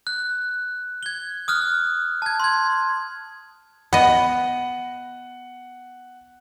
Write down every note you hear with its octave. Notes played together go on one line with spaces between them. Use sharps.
F#6
G#6 G7
D#6 F6 F#6
A5 G#6
C6 G#6
B3 D#5 F#5